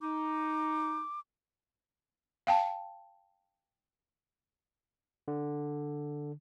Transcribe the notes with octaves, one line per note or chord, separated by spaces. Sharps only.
D#4 D6
F5 G5 A5
D3